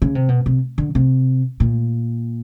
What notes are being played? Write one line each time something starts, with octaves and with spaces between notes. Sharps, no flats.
C#3
C3
B2
C3
D3
C3
A#2